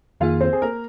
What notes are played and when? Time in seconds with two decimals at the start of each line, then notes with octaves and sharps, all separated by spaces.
0.20 F2 D#3 A#3 F4 G#4 F5
0.41 C4 C5
0.53 G#4
0.62 A#3 A#4